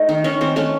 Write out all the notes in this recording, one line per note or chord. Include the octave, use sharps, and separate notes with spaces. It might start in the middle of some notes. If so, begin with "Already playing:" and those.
Already playing: A3 D#4
D#3
D#3 C#4
D#3 C4
A3 C#4